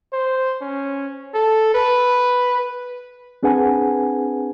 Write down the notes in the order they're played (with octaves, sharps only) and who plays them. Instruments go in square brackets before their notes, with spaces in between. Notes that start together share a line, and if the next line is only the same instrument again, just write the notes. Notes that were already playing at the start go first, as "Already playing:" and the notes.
[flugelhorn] C5
C#4
A4
B4
[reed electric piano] C4 D4 G#4 B4 F#5 G#5